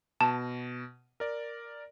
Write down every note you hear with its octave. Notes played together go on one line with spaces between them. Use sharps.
B2 A5
A#4 D5